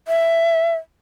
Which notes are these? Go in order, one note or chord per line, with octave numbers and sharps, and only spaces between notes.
E5